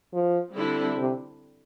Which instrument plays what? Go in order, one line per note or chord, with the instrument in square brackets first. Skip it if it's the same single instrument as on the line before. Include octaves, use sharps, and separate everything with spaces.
[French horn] F3
[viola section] D3 G3 C4 E4
[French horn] C3